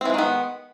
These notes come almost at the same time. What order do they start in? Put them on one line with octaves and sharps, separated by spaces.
C4 E3 G#3 D#3 B3